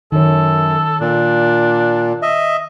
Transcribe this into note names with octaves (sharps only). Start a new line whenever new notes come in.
F#2 D#3 A4 C#5
A#2 D4
D#5 E5